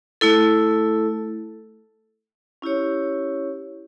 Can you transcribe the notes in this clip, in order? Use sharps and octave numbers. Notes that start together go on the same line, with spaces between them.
A3 E4 A4
C#4 E4 G4 C#5